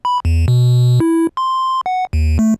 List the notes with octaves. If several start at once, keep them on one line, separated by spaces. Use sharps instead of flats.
B5
E2
B2
E4
C6
F#5
D#2
A3